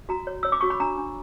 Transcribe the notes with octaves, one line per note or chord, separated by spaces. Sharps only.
F#4 A#5
C#5
C#5 E6
D6
F#4 C#6
B5
D4 A#5
D4